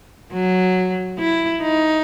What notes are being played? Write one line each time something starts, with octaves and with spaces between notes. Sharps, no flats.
F#3
E4
D#4